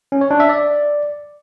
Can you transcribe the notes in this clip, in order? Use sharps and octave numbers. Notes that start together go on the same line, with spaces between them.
C#4
C#5
D4
E5
D5